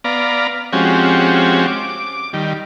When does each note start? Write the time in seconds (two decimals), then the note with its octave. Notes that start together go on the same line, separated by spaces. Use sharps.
0.04 B3 D5 F5 A#5
0.73 F3 G#3 C4 C#4 F#4 G4
1.67 D6
2.33 D#3 G3